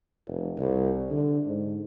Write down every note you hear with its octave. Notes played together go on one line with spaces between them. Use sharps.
F1
C2
D3
G#2